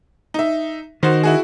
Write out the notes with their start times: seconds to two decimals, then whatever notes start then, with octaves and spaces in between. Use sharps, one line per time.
0.34 D#4 E5
1.03 D#3 F#4 C5
1.23 E4 F#4 G#4